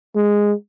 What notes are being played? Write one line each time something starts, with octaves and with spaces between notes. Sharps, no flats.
G#3